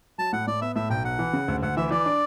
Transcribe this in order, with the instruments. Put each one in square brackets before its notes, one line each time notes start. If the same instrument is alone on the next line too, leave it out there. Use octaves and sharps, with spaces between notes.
[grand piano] F#3 [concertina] A5
[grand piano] A2 [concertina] F#5
[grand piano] A2 [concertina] D5
[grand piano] B3 [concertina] E5
[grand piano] A2 [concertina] E5
[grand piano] B1 [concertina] G5
[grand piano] B1 [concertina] F#5
[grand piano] E3
C#3
D2
[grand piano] D2 [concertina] F#5
[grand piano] E3 [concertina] E5
[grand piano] E3 [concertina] D5
[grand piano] D4